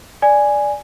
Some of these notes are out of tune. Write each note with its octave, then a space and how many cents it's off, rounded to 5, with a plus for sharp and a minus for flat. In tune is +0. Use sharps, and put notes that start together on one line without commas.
D5 +0 G#5 +0